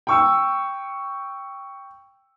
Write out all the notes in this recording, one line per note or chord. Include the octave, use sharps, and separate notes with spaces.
G5 C#6 E6